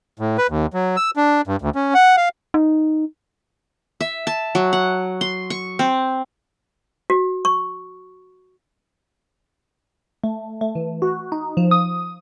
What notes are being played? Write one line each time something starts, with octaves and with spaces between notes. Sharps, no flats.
A2
B4
D#2
F#3
E6
D4
G2
D2
C#4
F#5
F5
D#4
E5
A5
F#3
F#5
C6
C#6
C4
F#4
C#6
A3
A3
E3
F#4
D#4
F3
D#6